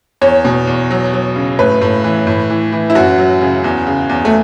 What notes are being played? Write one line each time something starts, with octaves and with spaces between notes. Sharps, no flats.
E2 C#5
B2
E2
F#3
F#3
C#3
A2 B4
A2
E3
A2
E3
E3
E4
F#2 F#4
F#3
C#3
E2
C#3
E2
A3